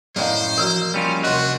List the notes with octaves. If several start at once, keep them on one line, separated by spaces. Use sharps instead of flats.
F#2 A2 D#3 C5 D5 D#5 F5
E3 F3 A#3 F#4
G3 C#4 F4
D#2 C3 D4 F#4